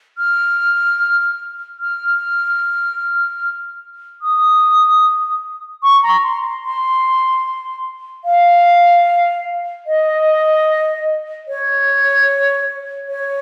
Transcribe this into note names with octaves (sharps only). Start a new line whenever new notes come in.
F6
F6
D#6
C#6
A#5
C6
C6
F5
D#5
C#5
C#5